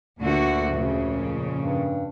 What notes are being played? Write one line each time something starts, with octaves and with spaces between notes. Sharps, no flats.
D2 A#2 D3 F#4
F2 A#2 C#3
G2